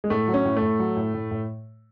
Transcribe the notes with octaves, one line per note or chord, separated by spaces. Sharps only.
G#3
A2 A3
F#3
C#4
A2
A3
A2
F#3
A2
A2
A2